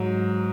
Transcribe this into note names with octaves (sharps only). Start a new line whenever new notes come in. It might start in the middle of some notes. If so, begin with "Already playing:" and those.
Already playing: G#2 F#3